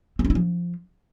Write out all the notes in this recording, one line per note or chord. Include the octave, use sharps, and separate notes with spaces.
C4
C#4
E4
F3